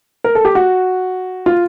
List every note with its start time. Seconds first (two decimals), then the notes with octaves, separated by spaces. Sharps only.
0.24 A#4
0.35 A4
0.45 G4
0.55 F#4
1.46 F4